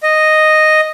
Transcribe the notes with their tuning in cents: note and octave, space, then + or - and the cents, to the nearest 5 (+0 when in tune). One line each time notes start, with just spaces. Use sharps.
D#5 -5